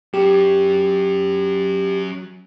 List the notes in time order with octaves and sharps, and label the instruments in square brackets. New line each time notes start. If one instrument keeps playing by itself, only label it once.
[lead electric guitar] F#3 C#4 [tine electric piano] G4